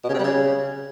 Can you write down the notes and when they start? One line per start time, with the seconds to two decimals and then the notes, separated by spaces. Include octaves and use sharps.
0.04 B2
0.09 C#3
0.14 C3
0.19 G3
0.24 C#3